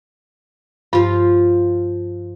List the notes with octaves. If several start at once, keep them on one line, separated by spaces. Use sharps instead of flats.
G2 F3 F4